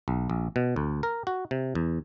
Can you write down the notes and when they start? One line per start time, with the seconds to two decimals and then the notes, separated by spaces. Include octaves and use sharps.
0.08 B1
0.30 A#1
0.56 B2
0.76 D2
1.03 A#4
1.27 F#4
1.51 C3
1.75 E2